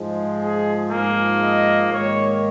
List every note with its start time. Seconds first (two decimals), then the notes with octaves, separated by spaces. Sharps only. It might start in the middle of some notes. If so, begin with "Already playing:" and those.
Already playing: G#2 F3 G#3
0.40 G#4
0.91 G#2 F3 A#3 G#4
1.42 D#5
1.93 G#2 D#3 A#3 C#5